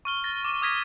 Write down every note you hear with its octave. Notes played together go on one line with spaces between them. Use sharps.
C#6 F6 G7
A6 A#6
D6 D#7
D#6 F6 G#6 A#6 B6 D#7